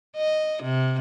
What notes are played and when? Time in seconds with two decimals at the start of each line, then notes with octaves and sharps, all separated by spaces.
0.17 D#5
0.63 C3